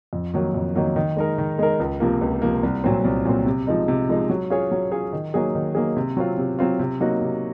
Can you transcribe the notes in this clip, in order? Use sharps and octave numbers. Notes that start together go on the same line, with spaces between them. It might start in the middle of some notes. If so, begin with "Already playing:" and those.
F2
D#3 F#3 A#3
F2
D#3 F#3 A#3
D#3
G#3 D#4 A#4
D#3
G#3 D#4 A#4
C#2
C3 F3 A#3
C#2
C3 F3 A#3
C2
A#2 F#3 C4
C2
A#2 F#3 C4
C3
F3 G#3 D#4
C3
F3 G#3 D#4
F#3
C#4 F4 G#4 C#5
F#3
C#4 F4 G#4 C#5
D#3
F#3 A#3 D#4 G#4
D#3
F#3 A#3 D#4 G#4
C3
F#3 C4 F4
C3
F#3 C4 F4
C3
F#3 A#3 D#4 F#4
C3